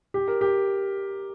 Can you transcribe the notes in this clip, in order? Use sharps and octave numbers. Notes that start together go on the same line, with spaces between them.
G4
A#4
G4